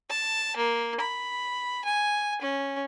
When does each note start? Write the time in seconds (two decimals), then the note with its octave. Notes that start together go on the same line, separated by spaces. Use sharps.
0.10 A5
0.57 A#3
1.00 B5
1.85 G#5
2.42 C#4